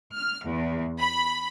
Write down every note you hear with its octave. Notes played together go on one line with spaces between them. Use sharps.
F6
E2
B5